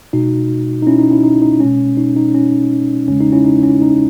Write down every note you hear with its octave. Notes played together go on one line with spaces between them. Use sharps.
B2 G#3 D#4 F#4
D#4
C#4 E4
D#4
C#4 E4
D#4
D#4
B2 G#3 C#4
D#4
D#4
C#4
E2 C#3 G#3 C#4
D#4
C#4 E4
D#4
C#4
D#4